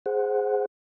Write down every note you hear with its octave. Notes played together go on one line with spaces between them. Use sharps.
G#4 C5 F#5